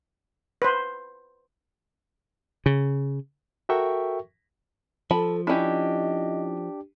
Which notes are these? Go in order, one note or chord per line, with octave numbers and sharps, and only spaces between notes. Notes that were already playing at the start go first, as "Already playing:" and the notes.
B4 C5
C#3
F#4 A4 A#4 E5 G5 C#6
F3 A4 A5 B5
C#4 D4 E4 G4 D#5